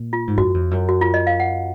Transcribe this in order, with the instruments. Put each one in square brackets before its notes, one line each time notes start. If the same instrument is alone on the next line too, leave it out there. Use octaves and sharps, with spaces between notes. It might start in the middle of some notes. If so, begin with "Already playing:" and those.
Already playing: [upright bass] A#2
[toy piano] F4
[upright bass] G#2
[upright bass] F#2 [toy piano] F#4
[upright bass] F2
F#2
[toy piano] F#4
F4
D#5
F5
F#5